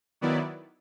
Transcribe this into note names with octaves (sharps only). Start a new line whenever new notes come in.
D#3 F#3 B3 E4 D5